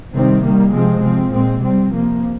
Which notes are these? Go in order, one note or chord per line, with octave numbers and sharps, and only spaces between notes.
C3 D#3 G3 C4
D#3 G3 A#3
C3 F3 G#3 C4
C3 F3 C4
A#2 G#3 C4
C3 G3 C4
C3 F3 A#3